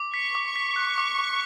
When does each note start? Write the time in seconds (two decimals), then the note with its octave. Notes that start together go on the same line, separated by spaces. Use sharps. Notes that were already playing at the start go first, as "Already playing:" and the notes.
Already playing: D6
0.14 C#6 B6
0.35 D6
0.45 C#6
0.56 B6
0.76 F#6
0.98 D6
1.18 D6